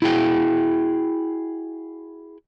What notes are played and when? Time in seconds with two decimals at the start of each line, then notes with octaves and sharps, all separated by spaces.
0.02 E4 F#4 G#4 E5 G5